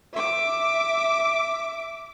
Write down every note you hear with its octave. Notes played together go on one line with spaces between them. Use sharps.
E5 D6